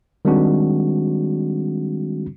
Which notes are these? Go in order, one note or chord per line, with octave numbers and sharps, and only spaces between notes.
D#3 G3 G#3 C4 D4 F#4